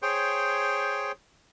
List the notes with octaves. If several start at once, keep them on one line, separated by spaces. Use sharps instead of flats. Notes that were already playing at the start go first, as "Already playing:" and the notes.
G#4 C5 C#5 G5